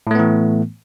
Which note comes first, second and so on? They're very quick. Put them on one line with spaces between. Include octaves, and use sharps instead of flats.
A2 A3 B3 E3